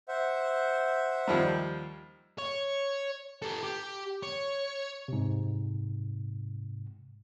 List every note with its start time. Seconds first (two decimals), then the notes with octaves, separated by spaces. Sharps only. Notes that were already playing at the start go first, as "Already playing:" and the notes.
0.08 C5 E5 F#5
1.27 D#2 F3 G3
2.38 C#5
3.42 G4 A4
3.63 G4
4.23 C#5
5.08 G#2 C3